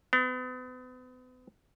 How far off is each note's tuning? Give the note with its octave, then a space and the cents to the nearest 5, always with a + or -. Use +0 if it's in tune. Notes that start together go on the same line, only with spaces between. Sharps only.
B3 +40